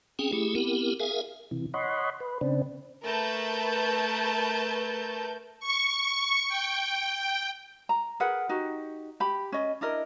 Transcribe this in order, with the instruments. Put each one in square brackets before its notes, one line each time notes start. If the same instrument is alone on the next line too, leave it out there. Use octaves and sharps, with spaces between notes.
[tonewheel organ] C4 C#4 G#4 F#5 G5
A3 E4 G4 G#4
B3 C4 E4 G4 A#4
G#4 A#4 E5 F5 G#5
C3 E3
C#5 D#5 F#5 B5 C6
B4
C#3 C4 D4
[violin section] A3 A#4 B4 A5 G6
[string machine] C#6
G5
[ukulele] A#5
G#4 A#4 B4 F#5
D#4 F#4 G4
G4 B5
C#4 D#5
D4 E4 A#4 D#5